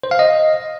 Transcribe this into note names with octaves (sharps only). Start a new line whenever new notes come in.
C5
F5
D#5